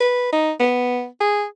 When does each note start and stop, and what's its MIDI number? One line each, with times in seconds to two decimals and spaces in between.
0.01 0.31 71
0.33 0.52 63
0.60 1.06 59
1.20 1.45 68